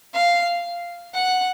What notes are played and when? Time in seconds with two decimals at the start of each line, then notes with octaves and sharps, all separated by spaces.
0.14 F5
1.14 F#5